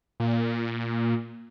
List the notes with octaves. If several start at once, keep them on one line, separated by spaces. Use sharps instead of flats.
A#2